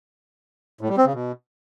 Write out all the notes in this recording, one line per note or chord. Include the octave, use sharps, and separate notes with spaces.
A2
G3
C4
C#3
B2